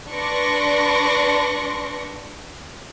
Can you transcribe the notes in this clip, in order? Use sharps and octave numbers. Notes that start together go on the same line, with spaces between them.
D4 B4 D5 C6 C#6 A#6